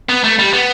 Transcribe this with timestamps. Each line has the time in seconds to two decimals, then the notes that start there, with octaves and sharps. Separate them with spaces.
0.09 B3
0.24 A3
0.39 G3
0.53 B3